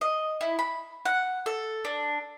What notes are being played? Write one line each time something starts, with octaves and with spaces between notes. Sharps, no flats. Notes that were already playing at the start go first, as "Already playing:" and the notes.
D#5
E4
B5
F#5
A4
D4